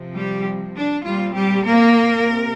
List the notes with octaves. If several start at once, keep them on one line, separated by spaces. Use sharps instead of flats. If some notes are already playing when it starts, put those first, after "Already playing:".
Already playing: C3 F3 C4
G3 G4
D4
A#2 G3 C4 F4
G3 G4
A#3 A#4
C3